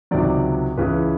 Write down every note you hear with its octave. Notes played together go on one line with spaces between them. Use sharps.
C#2 C3 D#3 F#3 D5
C#2 C#3 E3 B4